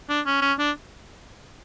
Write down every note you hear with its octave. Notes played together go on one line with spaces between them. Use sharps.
D4
C#4
C#4
D4